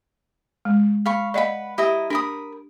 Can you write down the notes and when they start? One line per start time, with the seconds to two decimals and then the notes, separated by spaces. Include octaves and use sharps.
0.65 G#3
1.06 F5 B5 C#6
1.34 B4 D5 D#5 F5 F#5 B5
1.78 E4 G4 D#5 A#5
2.10 D4 A#4 B5 D#6